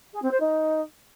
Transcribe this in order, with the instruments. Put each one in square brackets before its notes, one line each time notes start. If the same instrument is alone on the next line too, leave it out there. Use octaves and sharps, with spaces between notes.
[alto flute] G#4
C4
C5
D#4